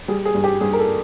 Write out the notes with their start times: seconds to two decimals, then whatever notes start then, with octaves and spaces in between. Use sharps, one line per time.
0.08 G3 G#4
0.25 G#4
0.35 G2
0.44 G4
0.61 G2 G#4
0.73 A#4
0.79 A4